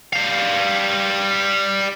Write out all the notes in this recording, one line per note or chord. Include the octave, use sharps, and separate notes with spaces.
G3 F5